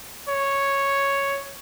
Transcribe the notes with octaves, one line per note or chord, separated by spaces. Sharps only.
C#5